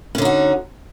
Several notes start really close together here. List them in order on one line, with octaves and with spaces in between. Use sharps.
C#4 D3 D#4 F#4